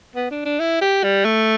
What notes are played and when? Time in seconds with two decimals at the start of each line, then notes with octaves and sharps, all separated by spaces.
0.16 B3
0.31 D4
0.45 D4
0.60 E4
0.81 G4
1.03 G3
1.25 A3